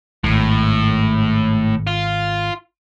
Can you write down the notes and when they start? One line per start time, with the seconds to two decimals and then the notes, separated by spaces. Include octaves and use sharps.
0.24 D#1 G#1 A2
1.87 F4